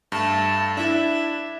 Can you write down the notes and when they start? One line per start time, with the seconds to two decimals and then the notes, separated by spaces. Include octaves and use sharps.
0.12 G2 A3 A5
0.77 D4 E4 E5